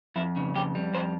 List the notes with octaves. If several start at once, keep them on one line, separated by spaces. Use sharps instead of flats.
F2 E4
C#3
F2 G4
G3
F2 C5